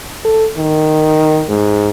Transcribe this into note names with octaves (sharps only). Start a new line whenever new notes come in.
A4
D#3
G#2